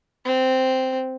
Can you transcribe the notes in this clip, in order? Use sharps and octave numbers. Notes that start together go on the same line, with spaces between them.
C4